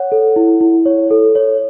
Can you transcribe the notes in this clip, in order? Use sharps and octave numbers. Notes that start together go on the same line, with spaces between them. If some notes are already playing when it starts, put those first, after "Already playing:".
Already playing: C#5 F#5
A4
E4
E4
C#5
A4
C#5